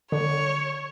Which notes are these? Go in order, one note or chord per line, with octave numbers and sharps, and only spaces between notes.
D3 C#5